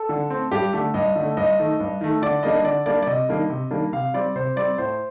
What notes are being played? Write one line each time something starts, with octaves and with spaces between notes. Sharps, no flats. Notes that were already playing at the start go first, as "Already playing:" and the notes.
Already playing: A4
D3
A3 C4
G2 G4
D3 A3
G2 D#5
D3 A3
G2 D#5
D#3 A3
G2
D#3 A3
D3 D5
G3 A#3 D4 D#5
D3 D5
G3 A#3 D4 D5
D5
C3 D#5
D#3 G3 A#3 D4
C3
D#3 G3 A#3 D4
C3 F5
G3 C4 D5
C3 C5
G3 C4 D5
A2 C5